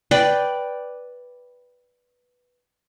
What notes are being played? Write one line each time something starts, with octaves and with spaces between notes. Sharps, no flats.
B4 D5 G5